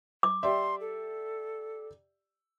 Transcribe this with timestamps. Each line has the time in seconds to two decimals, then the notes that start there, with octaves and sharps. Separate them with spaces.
0.23 D6
0.43 G4 D5 E5 C6
0.81 A4